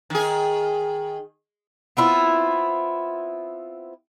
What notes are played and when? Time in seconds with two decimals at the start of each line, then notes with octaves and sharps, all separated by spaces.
0.10 D#3 G#4
1.97 B3 C4 E4 F4